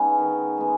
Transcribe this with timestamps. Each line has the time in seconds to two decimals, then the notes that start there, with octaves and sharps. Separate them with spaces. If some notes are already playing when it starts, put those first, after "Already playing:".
Already playing: G#3 B3 C#4 D#4
0.18 D#3
0.58 G#3 B3